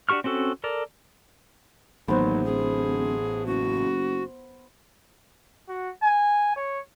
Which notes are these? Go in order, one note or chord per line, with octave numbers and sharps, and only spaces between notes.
D4 F#4 G4 C#6 F6
C4 C#4 F#4 A4
A4 A#4 D5
A1 D#2 F#3 B3 C5
D1 G#4
F#1 F#4
F#4
G#5
C#5